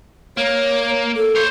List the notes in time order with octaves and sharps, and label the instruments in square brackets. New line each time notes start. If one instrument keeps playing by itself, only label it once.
[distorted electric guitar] A#3 [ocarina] C#5
[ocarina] A4
[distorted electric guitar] C5 C#5